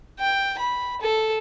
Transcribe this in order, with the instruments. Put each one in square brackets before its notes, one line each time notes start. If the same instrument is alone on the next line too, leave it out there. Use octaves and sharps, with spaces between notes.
[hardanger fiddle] G5
B5
A4